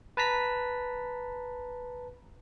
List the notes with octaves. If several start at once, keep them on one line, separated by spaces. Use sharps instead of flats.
B4 A5 A#5 B6